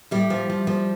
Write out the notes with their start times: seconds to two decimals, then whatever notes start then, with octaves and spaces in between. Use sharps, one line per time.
0.11 A2 G3
0.30 F3
0.50 F3
0.67 F3